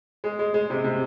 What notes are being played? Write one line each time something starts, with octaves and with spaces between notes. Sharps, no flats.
G#3
G#3
G#3
C3
C3